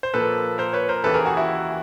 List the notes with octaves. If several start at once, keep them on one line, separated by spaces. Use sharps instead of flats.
C5
A#2 F3 A#3 A4 B4
A#4 C5
B4 C#5
A#4 C5
D#2 C#3 E3 A4 B4
G#4 A#4
F#4 G#4
E4 F#4